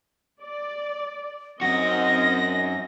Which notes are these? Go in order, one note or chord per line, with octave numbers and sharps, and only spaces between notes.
D5
F#2 C4 D#4 F#4 D#5 A#6